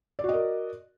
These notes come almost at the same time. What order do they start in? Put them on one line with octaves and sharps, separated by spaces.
D5 F#4 D#5 A#4